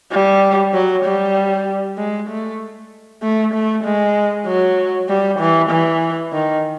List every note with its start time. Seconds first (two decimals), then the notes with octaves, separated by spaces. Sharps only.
0.12 G3
0.74 F#3
1.05 G3
1.98 G#3
2.30 A3
3.22 A3
3.54 A3
3.84 G#3
4.46 F#3
5.09 G3
5.39 E3
5.70 E3
6.32 D#3